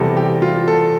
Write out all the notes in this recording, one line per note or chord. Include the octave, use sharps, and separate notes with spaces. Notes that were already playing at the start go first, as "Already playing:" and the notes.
Already playing: E2 C3 G3 A4
G4
F4
A4